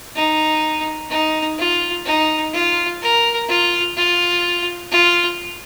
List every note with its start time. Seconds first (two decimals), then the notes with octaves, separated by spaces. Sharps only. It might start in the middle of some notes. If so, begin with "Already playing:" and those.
0.15 D#4
1.10 D#4
1.58 F4
2.05 D#4
2.53 F4
3.01 A#4
3.48 F4
3.96 F4
4.91 F4